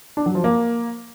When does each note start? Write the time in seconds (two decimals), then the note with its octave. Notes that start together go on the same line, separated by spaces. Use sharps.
0.17 D4
0.26 F#3
0.35 F3
0.44 A#3